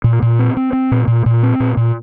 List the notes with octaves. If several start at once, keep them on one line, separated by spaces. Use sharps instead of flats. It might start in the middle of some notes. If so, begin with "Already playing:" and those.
A#2
A#2
C4
C4
C4
A#2
A#2
A#2
C4
A#2
A#2